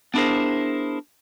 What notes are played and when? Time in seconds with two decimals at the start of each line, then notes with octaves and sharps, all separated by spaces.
0.14 B3 D4 E4 G#4 A#4 C5